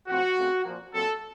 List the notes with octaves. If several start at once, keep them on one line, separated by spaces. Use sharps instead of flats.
A2 F3 C4 F#4
C#3 A3 C4
A#2 F3 A#3
A#2 F#3 C4 A4